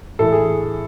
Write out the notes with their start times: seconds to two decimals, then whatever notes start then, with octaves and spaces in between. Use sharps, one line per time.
0.19 A2 E3 A4
0.32 G#4